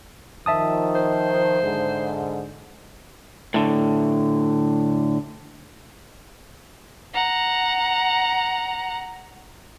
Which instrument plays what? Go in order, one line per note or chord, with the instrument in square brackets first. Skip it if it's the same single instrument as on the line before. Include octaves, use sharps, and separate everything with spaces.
[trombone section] D#3 F3 [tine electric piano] E5 A5 D#6
[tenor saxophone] C5
[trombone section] G#2 D3
[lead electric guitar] A2 D3
[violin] F#5 A#5